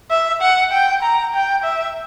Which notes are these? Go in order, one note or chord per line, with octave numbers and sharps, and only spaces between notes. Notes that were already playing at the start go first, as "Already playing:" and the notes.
E5
F#5
G5
A#5
G5
E5